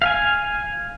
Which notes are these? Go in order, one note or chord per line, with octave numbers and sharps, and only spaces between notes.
F5 G#5